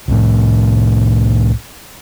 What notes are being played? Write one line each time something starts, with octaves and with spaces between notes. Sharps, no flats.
C2 A2